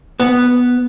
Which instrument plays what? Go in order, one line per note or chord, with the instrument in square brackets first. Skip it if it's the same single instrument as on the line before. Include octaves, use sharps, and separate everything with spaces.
[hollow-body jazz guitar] B3